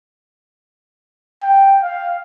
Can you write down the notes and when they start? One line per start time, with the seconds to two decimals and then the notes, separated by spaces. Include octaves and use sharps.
1.43 G5
1.83 F5